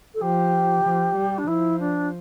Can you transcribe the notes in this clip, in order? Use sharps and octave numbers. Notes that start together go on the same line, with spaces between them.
A4
F3 G4
F3
G3
D4
F3 E4
D4